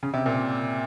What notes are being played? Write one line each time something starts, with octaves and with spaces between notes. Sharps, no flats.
C#3
C3
A#2